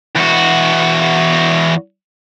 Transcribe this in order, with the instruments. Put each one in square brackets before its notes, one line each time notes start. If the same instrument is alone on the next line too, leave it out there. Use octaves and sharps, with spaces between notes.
[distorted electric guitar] E2 F#4